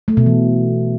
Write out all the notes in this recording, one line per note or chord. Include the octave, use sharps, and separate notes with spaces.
A3
B2
E3